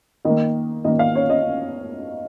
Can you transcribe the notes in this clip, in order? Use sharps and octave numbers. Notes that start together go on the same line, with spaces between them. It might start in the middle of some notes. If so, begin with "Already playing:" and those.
D#3 A#3 D#5
D#3 A#3 D#5
F5
C#5
D#5